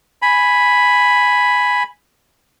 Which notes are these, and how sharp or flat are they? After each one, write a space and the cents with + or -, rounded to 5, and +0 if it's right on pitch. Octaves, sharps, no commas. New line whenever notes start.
G#5 +0 B5 +0